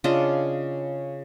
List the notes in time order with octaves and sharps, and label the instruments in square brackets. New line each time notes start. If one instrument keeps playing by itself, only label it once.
[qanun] C#3 D4 F4 D#5